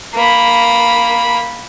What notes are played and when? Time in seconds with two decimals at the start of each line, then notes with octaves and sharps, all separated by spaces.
0.14 A#3 B5